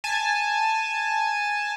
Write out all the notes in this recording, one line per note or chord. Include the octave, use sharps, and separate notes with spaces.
G#5 A5